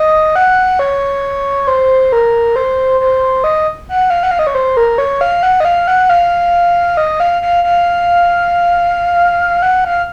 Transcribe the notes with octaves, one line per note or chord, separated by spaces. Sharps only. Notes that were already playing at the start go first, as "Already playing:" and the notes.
Already playing: D#5
F#5
C#5
C5
A#4
C5
C5
D#5
F#5
F5
F#5
F5
D#5
C#5
C5
A#4
C#5
F5
F#5
D#5
F5
F#5
F5
D#5
F5
F5
F5
F#5
F5